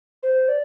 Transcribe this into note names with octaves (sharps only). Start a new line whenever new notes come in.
C5
D5